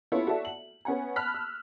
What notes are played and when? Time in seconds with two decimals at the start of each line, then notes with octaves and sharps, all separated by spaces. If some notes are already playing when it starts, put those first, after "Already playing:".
0.12 B3 C#4 E4 F4 A4 C#5
0.27 F#4 A4 D5 E5 A5
0.45 F#7
0.85 B3 C#4 F#5 G#5
1.16 A5 B5 F6 F#6 B6
1.34 E6